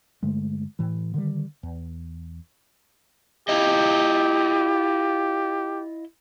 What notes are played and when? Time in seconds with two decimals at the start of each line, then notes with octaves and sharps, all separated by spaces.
0.22 G2 D3 G#3 A3
0.79 A2 E3
1.14 D3 D#3 G3
1.63 E2
3.49 E4 F4 G4 D#5